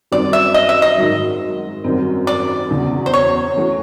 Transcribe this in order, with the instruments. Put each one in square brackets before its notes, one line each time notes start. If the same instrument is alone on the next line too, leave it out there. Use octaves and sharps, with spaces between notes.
[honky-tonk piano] F#2 D#3 G3 C4 [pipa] D5
[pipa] E5
D#5
E5
D#5
[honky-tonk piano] G#2 D#3 F#3
F#2 D#3 G3 C4
[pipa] D5
[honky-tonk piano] E2 C#3 F#3
[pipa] C5
C#5
[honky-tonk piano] E3 A3 C#4 F#4